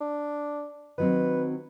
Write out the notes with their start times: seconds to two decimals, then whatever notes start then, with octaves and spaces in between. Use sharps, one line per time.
0.01 D4
0.98 D#3 F#3 C4 B4